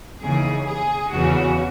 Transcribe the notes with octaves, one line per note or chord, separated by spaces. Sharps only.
D#2 C#3 E3 G#4
G#4
E2 C#3 E3 F#4